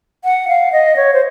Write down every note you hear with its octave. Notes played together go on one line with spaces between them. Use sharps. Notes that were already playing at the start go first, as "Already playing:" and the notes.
F#5
F5
D#5
C#5
C5